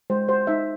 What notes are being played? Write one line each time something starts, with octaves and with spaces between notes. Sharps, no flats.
G#3 C5
F#4 C5
D#4 E5